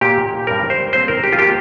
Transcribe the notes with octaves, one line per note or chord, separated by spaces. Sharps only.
A#2 A#3 G4
G2 G3 C4 A#4
C5
A#2 G3 C4 C5
A#4
G4
F4
F3 A#3 G4